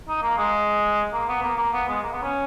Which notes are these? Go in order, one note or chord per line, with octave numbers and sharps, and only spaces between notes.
D#4
A#3
G#3
A#3
B3
A#3
A#3
B3
G#3
A#3
B3
C#4